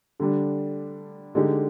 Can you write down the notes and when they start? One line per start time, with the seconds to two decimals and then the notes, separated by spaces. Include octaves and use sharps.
0.20 D3 G3 D4
1.35 D3 G#3 D#4 G4